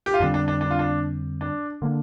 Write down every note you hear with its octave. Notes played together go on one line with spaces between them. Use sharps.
G4
F4
F2 D3 G3 C4 D4
D4
D4
D4
F4
D4
D4
D3 A#3 D4